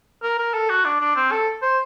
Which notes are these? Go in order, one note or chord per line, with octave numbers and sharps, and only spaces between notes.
A#4
A#4
A4
F#4
D4
D4
C4
A4
C5